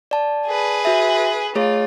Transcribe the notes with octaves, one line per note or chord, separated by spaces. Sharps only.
D5 A5
G#4 B4
F#4 E5
A3 F4 G#4 C#5